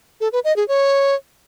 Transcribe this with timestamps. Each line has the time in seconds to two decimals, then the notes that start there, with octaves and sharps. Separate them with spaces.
0.21 A4
0.33 B4
0.44 D#5
0.56 G#4
0.68 C#5